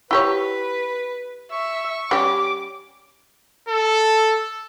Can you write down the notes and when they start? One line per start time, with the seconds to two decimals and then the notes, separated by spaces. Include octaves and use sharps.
0.11 E4 G4 B4 C#5
1.52 E5 C#6
2.11 G3 C#4 G4 D6
3.69 A4